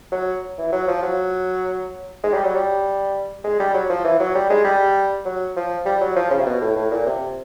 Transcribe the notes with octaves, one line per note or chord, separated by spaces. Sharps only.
F#3
E3
F#3
F3
F#3
G#3
G3
F#3
G3
G#3
G3
F#3
F3
E3
F#3
G3
G#3
G3
F#3
F3
G3
F#3
F3
C#3
C3
B2
A2
A2
A#2
C3